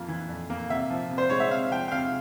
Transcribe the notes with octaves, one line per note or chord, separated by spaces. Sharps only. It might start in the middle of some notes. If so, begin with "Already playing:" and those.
Already playing: F2 A#3 F4
E3
F2
A#3
C3 E5
F3
C3
C5
G#3 C#5
E5
C3 F5
F3 G5
G5
C3 F5